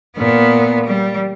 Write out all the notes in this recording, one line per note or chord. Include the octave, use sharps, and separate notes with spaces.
A#2 B3
G3